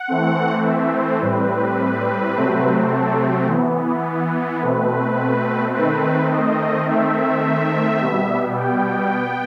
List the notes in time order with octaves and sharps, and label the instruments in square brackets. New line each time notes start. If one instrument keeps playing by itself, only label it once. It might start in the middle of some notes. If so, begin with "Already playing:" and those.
Already playing: [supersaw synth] F#5
E3 A3 C4
E5
C5
A2 G3 C4 B4
C3 F#3 A3 C4
A4
E3 B3
B2 A3 C4 B4
D#3 A3 C4 B4
D#5
D#3 A3 C4 E5
B2 G3 B3
G5
B3